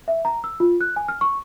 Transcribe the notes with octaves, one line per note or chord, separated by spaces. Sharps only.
E5
A#5
E6
F4
F#6
G#5
F6
C#6